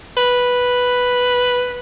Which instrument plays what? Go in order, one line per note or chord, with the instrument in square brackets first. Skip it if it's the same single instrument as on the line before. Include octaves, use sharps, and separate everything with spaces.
[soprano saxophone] B4